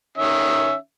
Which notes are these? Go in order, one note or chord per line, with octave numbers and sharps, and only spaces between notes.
D#3 C#4 E5